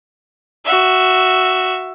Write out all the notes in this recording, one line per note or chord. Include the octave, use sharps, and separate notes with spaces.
F#4 E5